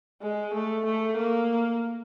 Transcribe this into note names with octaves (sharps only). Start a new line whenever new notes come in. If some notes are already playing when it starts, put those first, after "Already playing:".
G#3
A3
A3
A#3